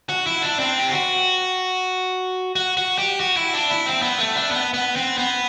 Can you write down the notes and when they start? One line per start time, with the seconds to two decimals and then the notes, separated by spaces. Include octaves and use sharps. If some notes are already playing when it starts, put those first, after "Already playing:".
0.09 F#4
0.27 E4
0.42 D4
0.59 C4
0.79 G4
0.92 F#4
2.56 F#4
2.77 F#4
2.98 G4
3.20 F#4
3.37 E4
3.54 D4
3.70 E4
3.86 C4
4.02 B3
4.18 A3
4.35 D4
4.51 B3
4.74 B3
4.96 C4
5.18 B3